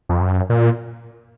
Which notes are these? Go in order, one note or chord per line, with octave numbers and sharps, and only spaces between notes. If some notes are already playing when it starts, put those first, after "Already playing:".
F2
F#2
A#2